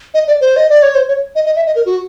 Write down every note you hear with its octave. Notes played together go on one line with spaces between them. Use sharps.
D#5
D5
C5
D#5
D5
C#5
C5
C#5
D#5
D#5
E5
D#5
A#4
F#4